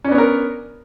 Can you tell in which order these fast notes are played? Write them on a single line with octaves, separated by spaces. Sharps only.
C#4 D4 B3 C#5 A#4